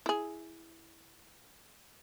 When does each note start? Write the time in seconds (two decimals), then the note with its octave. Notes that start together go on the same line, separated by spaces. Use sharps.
0.06 E4 G#4